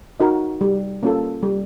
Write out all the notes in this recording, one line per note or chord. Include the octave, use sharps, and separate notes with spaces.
D#4 F#4 A#4 D#5
G3
A#3 C#4 F4 A4
G3